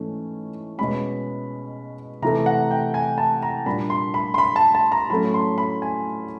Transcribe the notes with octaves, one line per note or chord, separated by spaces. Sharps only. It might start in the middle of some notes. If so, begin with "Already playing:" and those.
Already playing: G#2 E3 A3 C#4
B2 G#3 C#4 B5
C3 E3 A3 A#5
F#5
G5
G#5
A5
A#5
A#2 G3 A#3 D4 B5
C6
B5
C6
B5
A5
A5
A#5
A2 F#3 A3 C#4 B5
C6
B5
G#5